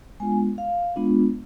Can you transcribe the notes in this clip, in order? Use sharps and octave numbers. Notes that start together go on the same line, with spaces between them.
G#3 B3 D4 F4 G#5
F5
G#3 B3 D4 F4